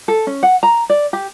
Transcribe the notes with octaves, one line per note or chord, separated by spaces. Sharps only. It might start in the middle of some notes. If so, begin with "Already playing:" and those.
A4
C#4
F#5
A#5
D5
G4